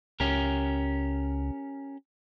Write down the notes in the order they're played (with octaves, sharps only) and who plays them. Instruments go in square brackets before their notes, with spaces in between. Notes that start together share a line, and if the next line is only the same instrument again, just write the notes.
[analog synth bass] C#2 [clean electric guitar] C#4 G4 A#4